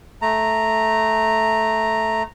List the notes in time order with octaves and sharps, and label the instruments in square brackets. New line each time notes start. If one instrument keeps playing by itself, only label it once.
[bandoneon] A3 A#5